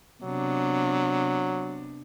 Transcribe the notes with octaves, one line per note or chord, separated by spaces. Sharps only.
C3 F#3 B3 D4